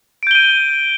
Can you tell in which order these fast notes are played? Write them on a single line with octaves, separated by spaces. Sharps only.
D7 G6 G7 D#7